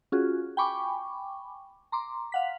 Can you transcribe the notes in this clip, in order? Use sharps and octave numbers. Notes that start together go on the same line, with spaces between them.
C#4 F4 F#4 G#4
G5 G#5 B5 C#6 D6
A#5 C6 D6
F5 F#5 B6